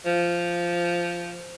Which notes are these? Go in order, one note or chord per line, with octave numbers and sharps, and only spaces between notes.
F3